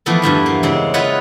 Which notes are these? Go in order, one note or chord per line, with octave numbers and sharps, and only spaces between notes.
E3 F3 A3 B3 C4
E2 G2 E3 A3
A#3
C#3 G#3 C4 C#4
F4 B4 C#5 D#5 E5 F#5